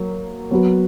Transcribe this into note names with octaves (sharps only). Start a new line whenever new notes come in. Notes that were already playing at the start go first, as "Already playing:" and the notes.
Already playing: F#3 A#3
F#3 B3 F#4 B4